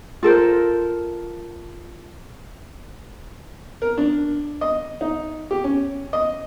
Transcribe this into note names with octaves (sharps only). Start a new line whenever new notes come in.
F4 A4 A#4 C5
A#4
D4
D#5
D#4
G4
C#4
D#5